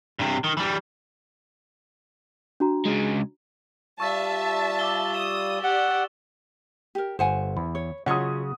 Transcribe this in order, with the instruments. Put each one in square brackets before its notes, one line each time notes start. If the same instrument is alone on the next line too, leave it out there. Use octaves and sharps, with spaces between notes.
[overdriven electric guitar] G2 C3
D#3
E3 G3
[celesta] D4 F#4 A#5
[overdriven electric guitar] C#3 G#3
[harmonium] G3 F4 [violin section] E5 A5 [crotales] C#6 E6 A6
[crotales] D6 E6 G7
[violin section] D#6 [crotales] E7
[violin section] G4 D5 [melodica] F#5 [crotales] G7
[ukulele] G4 A#4
[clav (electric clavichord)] G1 [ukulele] C5 F#5 G#5
[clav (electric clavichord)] E2 [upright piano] B5
[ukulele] C#5
[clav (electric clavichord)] C#3 F#3 C#4 [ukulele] F4 C#5 D#5 [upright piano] F#5 D#6